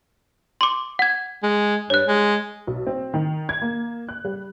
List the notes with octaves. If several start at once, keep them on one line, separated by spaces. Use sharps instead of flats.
C6 D6
F#5 G#6
G#3
G2 C#5 F#6
G#3
B1
C4
D#3
G#6
A#3
F#6
G3